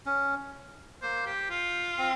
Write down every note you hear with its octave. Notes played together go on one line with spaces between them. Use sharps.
C#4
A#3 C5
G4
F4
C4